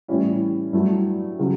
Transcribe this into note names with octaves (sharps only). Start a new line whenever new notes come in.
A2 E3 G3 C#4 E4
G2 F#3 A3 E4
C#3 F#3